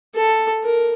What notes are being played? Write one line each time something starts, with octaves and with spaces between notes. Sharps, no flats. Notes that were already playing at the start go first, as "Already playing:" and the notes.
A4
A#4